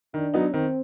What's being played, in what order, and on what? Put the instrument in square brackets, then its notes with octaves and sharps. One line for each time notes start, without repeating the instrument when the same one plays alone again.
[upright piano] D#3 [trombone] D4
[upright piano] F#3 B3 D#4
[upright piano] D#3 [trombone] C4